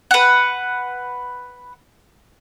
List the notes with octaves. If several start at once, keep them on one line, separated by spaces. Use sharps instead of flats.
B4 F#5